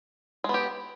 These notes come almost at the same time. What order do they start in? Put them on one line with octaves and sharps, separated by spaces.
G#3 B3 G4